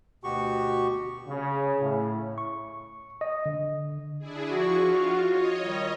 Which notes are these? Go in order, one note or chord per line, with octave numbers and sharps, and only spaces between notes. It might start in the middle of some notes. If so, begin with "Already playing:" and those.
D2 B2 F#4 G4 C#6
C#3
A2
C#6
D#5
D3
D4 E4 G#4
F3 F#4 C#6
F4
C#5 D#5
D#3 G3